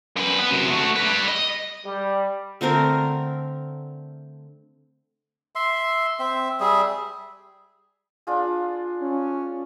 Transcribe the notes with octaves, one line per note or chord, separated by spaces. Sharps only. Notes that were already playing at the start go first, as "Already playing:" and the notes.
F#2 B4
B3 B4
F#2 C3
A3 F#4
G3 B4
D#5
G3
D3 A3 C4 A#4
E5 C6
C4 E5
G3 G#4 E5
D4 F4 G#4
C#4